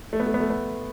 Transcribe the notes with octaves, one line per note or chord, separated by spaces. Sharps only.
A3
B3
A3
B3
A3
B3